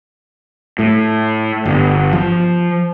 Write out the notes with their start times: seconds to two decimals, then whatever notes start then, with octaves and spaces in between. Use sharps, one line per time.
0.79 A2
1.65 G1
2.13 F3